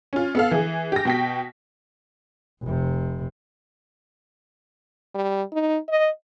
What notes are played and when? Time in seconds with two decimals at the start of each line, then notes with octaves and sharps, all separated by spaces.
0.13 C#4 F4
0.35 B3 A4 F5
0.51 E3 G#4
0.92 G4 A#6
1.05 B2 G5 B6
2.63 F1 C3
5.15 G3
5.52 D#4
5.89 D#5